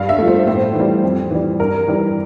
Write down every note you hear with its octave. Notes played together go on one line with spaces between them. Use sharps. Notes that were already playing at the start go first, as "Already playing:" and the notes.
Already playing: G2 F5
E5
F3 A3
C5
A2 C5
E3 G3
F2
E3 G3
G2 A#4
E3 G3